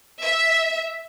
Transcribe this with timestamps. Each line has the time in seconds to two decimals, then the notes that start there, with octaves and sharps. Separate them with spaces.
0.21 E5